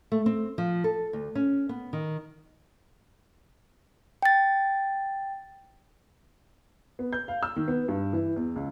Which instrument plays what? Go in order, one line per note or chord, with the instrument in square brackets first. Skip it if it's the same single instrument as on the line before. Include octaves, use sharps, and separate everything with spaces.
[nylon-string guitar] A3
C4
F3
A4
D2
C#4
B3
D#3
[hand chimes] G5 A6
[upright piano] B3
G6
F5
E6
D#3
B3
G2
E3
E2
C#2